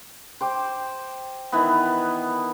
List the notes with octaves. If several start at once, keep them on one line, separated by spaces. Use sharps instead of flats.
C5 G5 D6
D#3 E3 B3